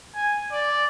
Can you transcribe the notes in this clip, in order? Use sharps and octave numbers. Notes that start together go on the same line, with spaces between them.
G#5
D5